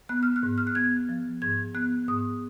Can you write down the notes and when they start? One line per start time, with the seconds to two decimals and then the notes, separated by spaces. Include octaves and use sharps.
0.09 B3 F#6
0.23 F6
0.36 F#6
0.43 G#2
0.58 F6
0.67 F#6
0.75 B3 G#6
1.09 F3
1.42 G#2 G#6
1.75 B3 F#6
2.08 G#2 D#6